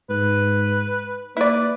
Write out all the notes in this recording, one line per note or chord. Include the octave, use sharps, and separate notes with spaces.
G#2 B4
A#3 E4 B4 D5